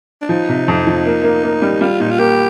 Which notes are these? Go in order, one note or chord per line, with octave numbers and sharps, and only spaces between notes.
D4
F3 D#4
C3
F2
F3
A#3
A#3
A#3
G3
G3 F4
A#2 D#4
F4
A#3 G4